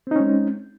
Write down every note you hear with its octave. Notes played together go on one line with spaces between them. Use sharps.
G#3 C4 C#4 D#4